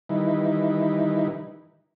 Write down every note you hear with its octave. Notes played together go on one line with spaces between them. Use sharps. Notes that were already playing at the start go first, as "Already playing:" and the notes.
D#3 E3 G3 D#4 E4 B4